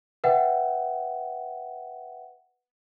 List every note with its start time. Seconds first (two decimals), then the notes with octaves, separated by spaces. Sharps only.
0.24 B4 E5 F#5 G5